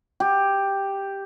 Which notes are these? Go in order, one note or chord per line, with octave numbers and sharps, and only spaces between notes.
G4